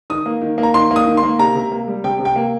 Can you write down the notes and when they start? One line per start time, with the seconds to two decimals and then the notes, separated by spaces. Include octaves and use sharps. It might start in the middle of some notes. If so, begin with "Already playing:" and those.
0.10 D#3 D#6
0.26 A#3
0.42 D#3
0.58 A#3
0.63 A#5
0.74 D#3 C6
0.91 A#3
0.96 D#6
1.07 D#3
1.17 C6
1.23 A#3
1.39 C3 A#5
1.55 C3
1.72 A#3
1.88 G3
2.04 C3 G5
2.20 C3
2.25 G5
2.36 A#3